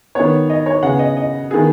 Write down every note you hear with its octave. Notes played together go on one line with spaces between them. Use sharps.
D#3 B3 C#5
D#5
C#5
C#3 B3 F#5
D#5
D#5
D#3 B3 G#4